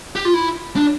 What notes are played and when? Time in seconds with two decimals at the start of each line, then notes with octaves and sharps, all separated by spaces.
0.16 G4
0.25 F4
0.34 E4
0.76 D4